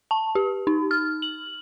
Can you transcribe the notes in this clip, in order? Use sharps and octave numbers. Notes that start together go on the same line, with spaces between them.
A5
G4
D#4
F6
F#7